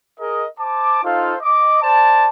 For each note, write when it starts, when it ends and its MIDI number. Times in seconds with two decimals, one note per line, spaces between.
0.20 0.45 68
0.20 0.45 70
0.20 0.45 75
0.59 1.01 72
0.59 1.01 81
0.59 1.01 86
1.03 1.35 63
1.03 1.35 65
1.03 1.35 69
1.03 1.35 72
1.03 1.35 77
1.42 1.79 75
1.42 1.79 86
1.82 2.29 72
1.82 2.29 74
1.82 2.29 81